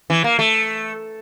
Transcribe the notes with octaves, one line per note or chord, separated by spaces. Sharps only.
E3
A#3
A3